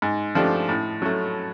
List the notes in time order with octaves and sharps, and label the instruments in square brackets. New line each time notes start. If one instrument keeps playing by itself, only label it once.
[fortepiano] G#2
F3 A3 D4 G4
A2
F#3 A3